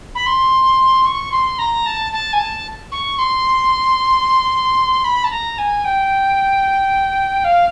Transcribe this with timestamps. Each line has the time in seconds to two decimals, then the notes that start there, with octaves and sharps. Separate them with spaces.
0.15 B5
0.26 C6
1.06 C#6
1.32 C6
1.59 A#5
1.86 A5
2.12 A5
2.33 G#5
2.39 A5
2.92 C#6
3.18 C6
5.04 B5
5.24 A5
5.31 A#5
5.58 G#5
5.84 G5
7.44 F5